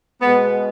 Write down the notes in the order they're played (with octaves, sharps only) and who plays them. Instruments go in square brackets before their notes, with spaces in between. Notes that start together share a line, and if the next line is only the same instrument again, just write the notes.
[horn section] B2 G#3 B3